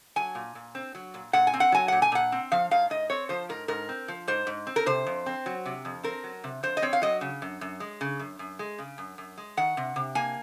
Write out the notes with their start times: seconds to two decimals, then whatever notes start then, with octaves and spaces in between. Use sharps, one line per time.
0.16 F#3 G#5
0.35 A#2
0.55 A#2
0.75 C4
0.95 F#3
1.14 A#2
1.33 A#2 F#5
1.47 G#5
1.54 C4
1.60 F#5
1.72 F#3 G#5
1.88 A#2 F#5
2.02 G#5
2.12 A#2 F#5
2.32 C4
2.52 F3 F5
2.71 G#2 F5
2.90 G#2 D#5
3.10 C4 C#5
3.29 F3 C5
3.49 G#2 A#4
3.68 G#2 A#4
3.89 C4
4.08 F3
4.28 G#2 C5
4.47 G#2
4.67 C4
4.76 A#4
4.86 C3 C5
5.07 F2
5.26 C4
5.46 F#3
5.66 C3
5.85 F2
6.04 C4 A#4
6.24 F#3
6.44 C3
6.63 F2 C5
6.77 D#5
6.82 C4 C#5
6.93 F5
7.02 F#3 D#5
7.21 C#3
7.42 F#2
7.61 F#2
7.80 G#3
8.01 C#3
8.19 F#2
8.39 F#2
8.59 G#3
8.79 C#3
8.98 F#2
9.18 F#2
9.38 G#3
9.57 D#3 F#5
9.77 C3
9.96 C3
10.15 A#3 G#5